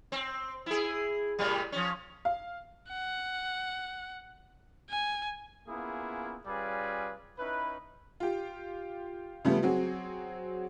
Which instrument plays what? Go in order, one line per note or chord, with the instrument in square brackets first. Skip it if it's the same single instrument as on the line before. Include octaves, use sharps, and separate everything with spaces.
[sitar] C4
E4 G#4
A2 C3 G3
F3 C#4
[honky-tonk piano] F5
[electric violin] F#5
G#5
[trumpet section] A#3 B3 C#4 E4 F4 G#4
G3 C#4 F4 G#4 B4 D5
C#4 D#4 E4 B4
[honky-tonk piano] F4 G4
C#3 F3 G3 A3 B3
F#3 C4 F#4 G#4